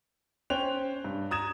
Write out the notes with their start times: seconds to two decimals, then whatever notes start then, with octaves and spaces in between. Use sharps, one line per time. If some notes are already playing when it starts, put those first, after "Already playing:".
0.50 C#4 C5 G5 F#6 F7
1.04 G2
1.31 A#5 D#6 G#6 E7